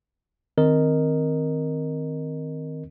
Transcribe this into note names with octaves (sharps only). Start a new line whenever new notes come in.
D#3 C4 A#4 D#5